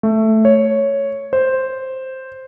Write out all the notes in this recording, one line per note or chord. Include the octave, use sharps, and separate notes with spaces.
A3
C#5
C5